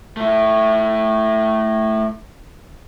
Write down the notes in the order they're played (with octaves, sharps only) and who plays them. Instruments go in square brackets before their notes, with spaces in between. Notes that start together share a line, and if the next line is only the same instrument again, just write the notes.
[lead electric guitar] A3 E4